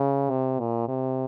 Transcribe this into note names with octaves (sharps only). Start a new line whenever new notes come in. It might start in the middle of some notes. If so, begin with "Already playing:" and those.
Already playing: C#3
C3
A#2
C3